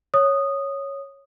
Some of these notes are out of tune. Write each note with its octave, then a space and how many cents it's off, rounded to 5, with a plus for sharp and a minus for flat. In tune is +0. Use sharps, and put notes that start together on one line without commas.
C#5 +0 D#6 -10